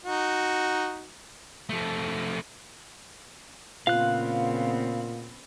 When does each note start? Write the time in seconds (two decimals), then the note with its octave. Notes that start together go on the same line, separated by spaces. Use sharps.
0.05 D#4 F#4
1.69 F3 A3
3.87 A#2 C#3 B3 C4 F4 F5 F#6